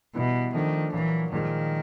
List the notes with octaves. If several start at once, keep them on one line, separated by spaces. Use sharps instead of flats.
B2 E3 G3 B3 E4
D#3 F3 A3 D4
A#2 E3 F#3 A#3
A#2 D#3 F3 G#3